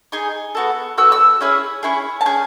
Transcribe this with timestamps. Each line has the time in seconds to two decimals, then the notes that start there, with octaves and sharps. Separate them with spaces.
0.12 D#4 G#4
0.55 B3 F#4 A4
0.97 B3 F#4 A4 E6
1.12 E6
1.41 C#4 E4 G#4
1.83 C#4 E4 G#4
2.21 A5
2.25 C#4 G#4 G#5